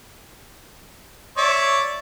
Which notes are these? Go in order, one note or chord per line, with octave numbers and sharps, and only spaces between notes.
C#5 D5 E5